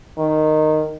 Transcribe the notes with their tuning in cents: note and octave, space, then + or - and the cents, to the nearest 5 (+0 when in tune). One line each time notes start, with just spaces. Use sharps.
D#3 -10